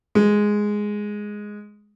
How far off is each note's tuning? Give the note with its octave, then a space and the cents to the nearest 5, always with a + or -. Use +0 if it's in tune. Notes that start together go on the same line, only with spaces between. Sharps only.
G#3 +0